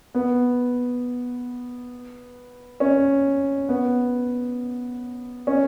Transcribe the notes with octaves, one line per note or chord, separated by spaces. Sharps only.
B3
C#4
B3
C#4